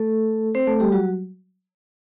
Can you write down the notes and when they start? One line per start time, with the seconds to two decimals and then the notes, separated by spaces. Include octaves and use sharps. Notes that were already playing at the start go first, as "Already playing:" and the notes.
Already playing: A3 A4
0.55 C4 C5
0.67 A3 A4
0.80 G3 G4
0.92 F#3 F#4